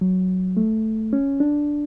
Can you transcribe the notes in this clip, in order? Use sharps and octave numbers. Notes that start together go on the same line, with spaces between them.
F#3
A3
C#4
D4